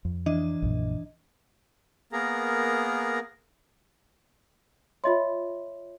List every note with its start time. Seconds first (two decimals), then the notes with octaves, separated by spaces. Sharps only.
0.05 F2
0.26 E3 D4 D#5
0.62 A#1 F#2 A#2
2.12 A#3 B3 G#4 A#4 A#5
5.04 F4 C#5 D#5 E5 B5 C6